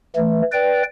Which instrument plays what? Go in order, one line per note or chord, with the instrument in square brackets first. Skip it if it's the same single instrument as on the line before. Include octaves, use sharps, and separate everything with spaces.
[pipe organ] E3 A3
B4 D5 G5